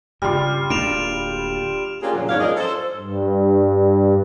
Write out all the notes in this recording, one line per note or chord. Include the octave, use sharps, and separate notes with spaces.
G2 C#3 G3 F4 F6
D1 A#3 D4 D7 E7 F7
A#3 C#4 D4 F4 G4 G#4
F#2 A#2 C#3 F3 F#3
E2 G#2 D4 C#5 F5
F3 C#4 G#4 A#4 D5 D#5
A4 C5
G2